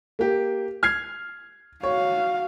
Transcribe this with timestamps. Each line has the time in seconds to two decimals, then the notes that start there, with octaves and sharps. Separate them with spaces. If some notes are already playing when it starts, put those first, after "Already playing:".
0.19 A#3 G4
0.83 F6 G#6 C7
1.83 F#4 C#5 F5